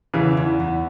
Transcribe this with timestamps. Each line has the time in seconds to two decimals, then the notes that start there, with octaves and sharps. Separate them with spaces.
0.14 E2 C#3 E3
0.37 E2
0.60 E2